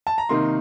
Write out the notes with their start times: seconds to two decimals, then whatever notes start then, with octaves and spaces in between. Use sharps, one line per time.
0.07 A5
0.18 A#5
0.29 C3 D#3 A#3 D#4 C6